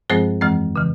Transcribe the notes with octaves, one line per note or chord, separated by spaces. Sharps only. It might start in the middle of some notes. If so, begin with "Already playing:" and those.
G2 F3 G#3 C4 G#4 C5
F2 E3 G#3 C4
C#3 E3